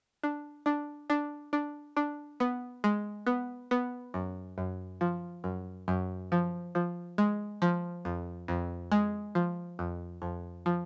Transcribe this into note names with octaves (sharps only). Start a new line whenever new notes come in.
D4
D4
D4
D4
D4
B3
G#3
B3
B3
F#2
F#2
F3
F#2
F#2
F3
F3
G#3
F3
F2
F2
G#3
F3
F2
F2
F3